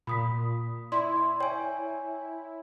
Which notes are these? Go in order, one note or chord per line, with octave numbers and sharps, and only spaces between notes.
A#2 B5 D#6 B6
E4 D5 C6
C#5 G5 G#5